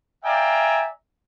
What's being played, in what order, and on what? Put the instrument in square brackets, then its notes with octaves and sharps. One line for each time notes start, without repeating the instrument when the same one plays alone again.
[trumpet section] D5 E5 F5 G5 G#5 A#5